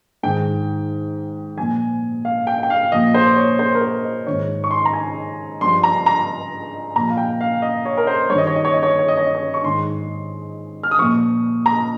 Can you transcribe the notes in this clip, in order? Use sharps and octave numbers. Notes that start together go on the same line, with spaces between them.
G#2 D#3 G5
A#2 F3 G#5
F5
G5
G5
F5
A#2 F3 D#5
C5
C#5
C5
A#4
C5
D#5
G#2 D#3 C#5
C#6
C6
A#5
G#5
G2 F3 C6
A#5
A#5
A#2 F3 A#5
F5
G5
F5
D#5
C#5
A#4
C5
G2 D#3 C#5 D#5
C#5
D#5
C#5
D#5
C#5
D#5
C#5
D#5
C#5
D#5
C#5
C#6
G#2 D#3 C6
F6
D#6
A#2 F3 C#6
A#5